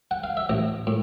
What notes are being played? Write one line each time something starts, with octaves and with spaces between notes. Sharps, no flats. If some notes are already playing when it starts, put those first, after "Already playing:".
F#5
F5
E5
A1 D#5
A2